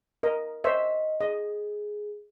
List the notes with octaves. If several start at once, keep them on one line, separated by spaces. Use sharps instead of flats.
A#4 D#5
C5 C#5 D#5 E5
G#4 D#5